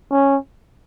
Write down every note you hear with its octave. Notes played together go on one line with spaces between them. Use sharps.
C#4